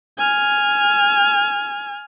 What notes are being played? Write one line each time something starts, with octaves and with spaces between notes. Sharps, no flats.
G#5 F6